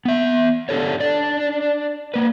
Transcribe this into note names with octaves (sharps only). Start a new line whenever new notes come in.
B3 E5
D4 G4 A4 C#5
D4 D5
A#3 B4